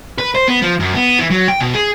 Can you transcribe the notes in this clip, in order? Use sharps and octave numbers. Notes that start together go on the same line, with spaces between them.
B4
C5
B3
F3
F#2
B3
E3
F#3
G5
B2
G#4